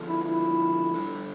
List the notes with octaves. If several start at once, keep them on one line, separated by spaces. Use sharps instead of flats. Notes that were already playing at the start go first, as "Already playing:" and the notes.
Already playing: D3 F3 B3 F4 A4
E4
E4
G3 D4 A4